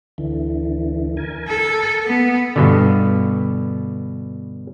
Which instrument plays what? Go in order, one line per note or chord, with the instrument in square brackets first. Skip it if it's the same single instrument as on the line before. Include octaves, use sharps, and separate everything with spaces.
[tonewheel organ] D2 D3 E3
A#4 G#5
[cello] A4
B3
[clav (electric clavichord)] G2 B2 D3